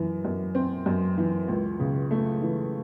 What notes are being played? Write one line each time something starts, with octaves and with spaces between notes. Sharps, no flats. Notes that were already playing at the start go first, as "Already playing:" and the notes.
Already playing: F#2 E3
F#2
C4
F#2
E3
C#2
C#3
A3
E3